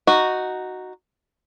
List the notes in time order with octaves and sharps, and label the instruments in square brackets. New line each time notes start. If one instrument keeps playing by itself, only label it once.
[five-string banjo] D#4 F#4